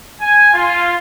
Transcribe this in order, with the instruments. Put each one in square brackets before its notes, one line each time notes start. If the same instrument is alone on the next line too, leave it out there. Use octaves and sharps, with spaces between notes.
[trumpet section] G#5
F4